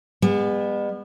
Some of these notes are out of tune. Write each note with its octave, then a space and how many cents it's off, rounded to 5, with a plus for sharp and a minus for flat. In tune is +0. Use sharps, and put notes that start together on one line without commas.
G#3 -45 B3 +0